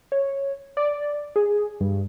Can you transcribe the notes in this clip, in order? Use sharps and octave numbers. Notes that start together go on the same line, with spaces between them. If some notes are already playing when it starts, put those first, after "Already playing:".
C#5
D5
G#4
G2